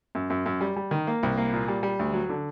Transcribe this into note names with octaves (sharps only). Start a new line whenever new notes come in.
F#2
F#2
F#2
G3
G3
D#3
A#3
C2
A#3
A#2
G3
G3
D2
F#3
D3